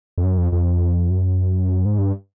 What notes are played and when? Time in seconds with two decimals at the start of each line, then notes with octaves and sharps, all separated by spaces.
0.18 F2
0.23 F#2
0.38 F2
0.52 F2
1.10 F#2
1.85 G#2
1.99 G2